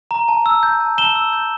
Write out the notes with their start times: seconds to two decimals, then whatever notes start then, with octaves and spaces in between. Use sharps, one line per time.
0.11 A#5
0.28 A5
0.46 E6
0.63 G6
0.81 A5
0.98 A5 E7 G7
1.15 E6
1.33 G6